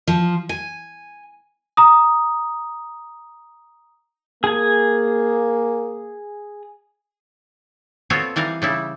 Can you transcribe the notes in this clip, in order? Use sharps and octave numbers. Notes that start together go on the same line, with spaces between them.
F3
G#5
A#5 D#6
A#3 G#4 G#5
B3 C4 F4 F#4 A4 C#5
E3 G3 A#4 F5
C#3 G3 E4